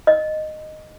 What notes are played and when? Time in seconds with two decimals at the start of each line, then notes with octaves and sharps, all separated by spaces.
0.07 D#5